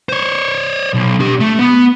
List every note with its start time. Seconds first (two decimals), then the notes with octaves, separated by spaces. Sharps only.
0.09 C5 C#5
0.94 B1
1.20 D4 G4
1.40 A3
1.59 B3